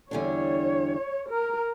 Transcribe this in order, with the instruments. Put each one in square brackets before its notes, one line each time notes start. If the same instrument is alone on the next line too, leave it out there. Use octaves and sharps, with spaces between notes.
[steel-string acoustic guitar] E2 D3 G3 D4 [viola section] C#5
[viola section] A#4